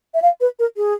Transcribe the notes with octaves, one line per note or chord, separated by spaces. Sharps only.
E5
F5
B4
A#4
G#4